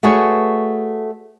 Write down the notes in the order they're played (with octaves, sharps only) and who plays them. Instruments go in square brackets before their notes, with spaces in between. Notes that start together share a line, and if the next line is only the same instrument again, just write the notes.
[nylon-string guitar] A3 F#4 G#4 B4 C#5